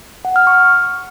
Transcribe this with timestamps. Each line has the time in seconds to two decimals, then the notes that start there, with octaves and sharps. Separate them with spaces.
0.25 F#5
0.36 F6
0.47 C#6